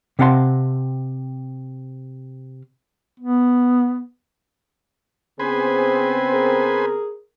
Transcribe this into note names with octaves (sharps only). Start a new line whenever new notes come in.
C3 C4 F5 F#5 A5 C6
B3
C#3 B3 C4 G#4 B4 C5 G#5
G#4 A#4